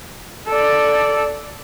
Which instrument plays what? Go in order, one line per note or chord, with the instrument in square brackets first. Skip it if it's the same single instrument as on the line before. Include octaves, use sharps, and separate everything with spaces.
[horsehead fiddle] A4 D5